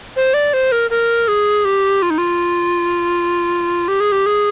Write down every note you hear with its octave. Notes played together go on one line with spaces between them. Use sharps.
C5
D5
C5
A#4
A#4
G#4
G4
F4
D#4
F4
G4
G#4
G4
G#4